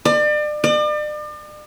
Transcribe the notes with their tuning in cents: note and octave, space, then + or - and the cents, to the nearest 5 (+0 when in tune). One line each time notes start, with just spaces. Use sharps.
D5 +35
D5 +40